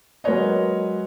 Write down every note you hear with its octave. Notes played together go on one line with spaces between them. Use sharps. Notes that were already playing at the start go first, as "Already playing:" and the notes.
F#3 G#3 A#4 B4 C#5 D#5